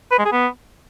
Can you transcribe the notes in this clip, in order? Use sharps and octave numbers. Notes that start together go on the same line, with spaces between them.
B4
G#3
G#4
B3